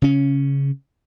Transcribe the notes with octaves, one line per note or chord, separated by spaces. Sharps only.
C#3 C#4